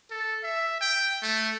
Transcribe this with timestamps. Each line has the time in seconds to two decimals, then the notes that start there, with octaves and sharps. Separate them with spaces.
0.11 A4
0.43 E5
0.81 G5
1.23 A3